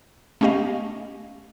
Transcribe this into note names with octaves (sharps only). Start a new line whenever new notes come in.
A3 B3 C#4 G4 D#5 F5